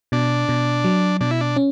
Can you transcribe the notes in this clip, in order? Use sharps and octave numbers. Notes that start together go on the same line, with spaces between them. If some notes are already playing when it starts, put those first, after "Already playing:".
B2 D4
B2
F#3
B2 D4
E4
D4
C#4